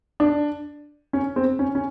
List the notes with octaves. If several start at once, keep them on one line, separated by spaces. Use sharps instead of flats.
D4
C#4
C4
C#4
C#4